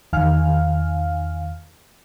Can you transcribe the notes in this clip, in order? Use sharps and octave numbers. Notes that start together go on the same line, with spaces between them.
E2 D#3 F5 G#5 F6